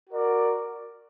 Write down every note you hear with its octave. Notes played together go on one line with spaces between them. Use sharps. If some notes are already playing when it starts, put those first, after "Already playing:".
F#4 A#4 D5